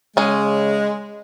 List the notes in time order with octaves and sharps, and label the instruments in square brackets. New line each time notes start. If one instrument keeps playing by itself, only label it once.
[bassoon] C#3 [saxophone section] G#3 [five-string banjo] C#4 G#4